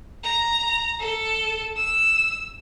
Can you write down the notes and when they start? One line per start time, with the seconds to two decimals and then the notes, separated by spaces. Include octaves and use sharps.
0.24 A#5
1.00 A4
1.76 E6